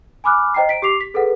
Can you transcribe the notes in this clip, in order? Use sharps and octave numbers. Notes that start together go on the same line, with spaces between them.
G#5 B5 D6 F6 F#6
C5 D#5 G5 A#5 C7
B6 D7
G4 D6 C7 F7
B6
G#4 A4 B4 F#5